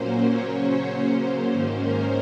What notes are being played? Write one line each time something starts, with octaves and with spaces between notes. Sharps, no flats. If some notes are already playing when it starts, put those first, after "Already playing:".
Already playing: A#2 F#3 A#3 C#4 C5
C#3 F#3 C#4 C#5
C5
C#3 F#3 A#3 C#4
G#2 D#3 A#3 C#4
A#4